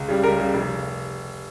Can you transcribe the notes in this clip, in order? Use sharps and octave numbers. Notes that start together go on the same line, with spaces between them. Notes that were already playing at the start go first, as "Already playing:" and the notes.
Already playing: C#2
C#3 G3
C#2 A#4
C#3 G3
F1